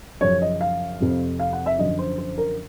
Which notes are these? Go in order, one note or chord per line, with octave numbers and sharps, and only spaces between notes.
F#2 C#3 F3 C#5
D#5
F5
F2 C3 F3
F5
F#5
E5
F#2 D3 F3 D#5
C5
C5
A#4